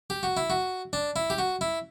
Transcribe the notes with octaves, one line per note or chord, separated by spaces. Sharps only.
G4
F#4
E4
F#4
D4
E4
G4
F#4
E4